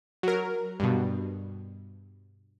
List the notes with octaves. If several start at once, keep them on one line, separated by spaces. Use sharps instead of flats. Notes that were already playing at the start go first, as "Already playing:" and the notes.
F#3 A#4
G2 B2